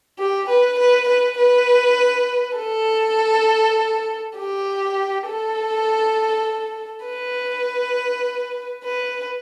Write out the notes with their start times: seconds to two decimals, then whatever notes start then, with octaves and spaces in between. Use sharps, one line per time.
0.19 G4
0.49 B4
0.79 B4
1.08 B4
1.38 B4
2.57 A4
4.37 G4
5.27 A4
7.06 B4
8.84 B4